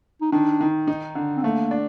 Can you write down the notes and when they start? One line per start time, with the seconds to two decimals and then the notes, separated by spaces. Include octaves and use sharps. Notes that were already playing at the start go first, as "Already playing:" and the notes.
0.22 D#4
0.32 D#3 D4
0.61 D#3
0.87 D#4
1.15 D3
1.37 C4
1.43 A3 A#3
1.71 D4